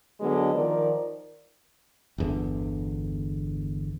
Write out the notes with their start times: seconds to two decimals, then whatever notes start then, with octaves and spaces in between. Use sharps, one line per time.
0.20 D3 F#3 G#3 B3
0.54 D#3 F3 A#4 D5
2.18 G1 E2 D3